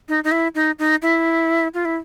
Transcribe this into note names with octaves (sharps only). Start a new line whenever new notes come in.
D#4
D#4
E4
D#4
D#4
E4
F4
E4